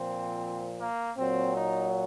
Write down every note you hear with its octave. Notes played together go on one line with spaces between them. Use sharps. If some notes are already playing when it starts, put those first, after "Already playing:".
Already playing: A#2 F3 C4
A#3
A#2 F#3 C4
D#4